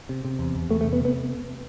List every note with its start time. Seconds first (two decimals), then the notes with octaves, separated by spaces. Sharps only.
0.09 C3
0.25 C3
0.39 E2
0.55 E2
0.70 E2 A3
0.81 A3
0.85 C3
0.93 B3
1.00 C3
1.05 B3